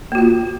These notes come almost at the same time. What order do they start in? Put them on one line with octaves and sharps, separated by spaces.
A#3 F#4 F4